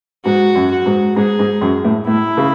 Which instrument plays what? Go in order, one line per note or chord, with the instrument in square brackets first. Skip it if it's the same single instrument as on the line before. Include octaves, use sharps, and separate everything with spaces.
[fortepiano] G#2 [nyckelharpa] F#4
[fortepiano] F#2
[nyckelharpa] F#4
[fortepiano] G#2
[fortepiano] G#2 [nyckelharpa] G#4
[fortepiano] G#2
F#2
A2
[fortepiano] A2 [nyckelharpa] E4
[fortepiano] C#3